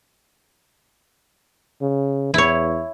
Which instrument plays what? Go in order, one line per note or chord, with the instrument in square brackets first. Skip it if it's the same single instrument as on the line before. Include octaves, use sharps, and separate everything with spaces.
[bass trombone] C#3
[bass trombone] E2 [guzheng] E4 C#5